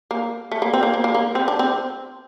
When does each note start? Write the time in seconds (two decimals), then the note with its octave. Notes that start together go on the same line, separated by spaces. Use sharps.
0.11 A#3
0.52 A3
0.62 A#3
0.74 C4
0.83 A#3
0.94 A#3
1.04 A#3
1.14 A#3
1.35 C4
1.48 D4
1.59 C4